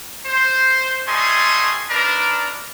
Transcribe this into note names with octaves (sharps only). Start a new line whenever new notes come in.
C5
G3 A3 D#5 G#5 C6
D4 D#4 A#4 B4 D5